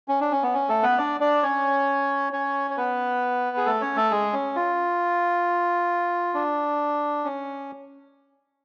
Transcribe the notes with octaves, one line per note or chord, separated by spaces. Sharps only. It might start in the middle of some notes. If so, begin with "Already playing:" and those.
C#4
D4
C#4
B3
C#4
A3 A4
B3 B4
D4 D5
D4 D5
C#4 C#5
C#4 C#5
C#5
B3 B4
G#4
A3 A4
C#4 C#5
A3 A4
G#3 G#4
C#4
F4
D4
C#4